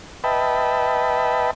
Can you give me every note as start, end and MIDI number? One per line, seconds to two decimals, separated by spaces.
0.24 1.51 71
0.24 1.51 75
0.24 1.51 76
0.24 1.51 79
0.24 1.51 81
0.24 1.51 83